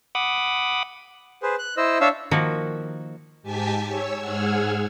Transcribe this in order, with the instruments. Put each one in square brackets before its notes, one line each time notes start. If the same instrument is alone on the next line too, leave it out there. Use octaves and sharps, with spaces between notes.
[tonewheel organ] F#5 B5 D6 D#6
[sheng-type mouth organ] G#4 B4 C5
F#6
E4 C5 D#5 E6
D4 C#5 E5 F5 E6
[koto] D#3 F3 A#3 F#4
[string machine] G#2 G4 G#5 A5 G#6 B6
C#5 E6
G#2 G#4 F#5 E6 F6 G#6